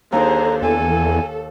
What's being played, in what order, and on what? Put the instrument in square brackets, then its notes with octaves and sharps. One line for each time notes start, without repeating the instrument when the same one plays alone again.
[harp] D#2 [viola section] D3 G#4 C5 [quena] A#5
[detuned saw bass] E2 [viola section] A4 [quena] G#5